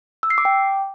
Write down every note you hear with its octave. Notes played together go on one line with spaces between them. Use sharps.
E6
C7
D6
G5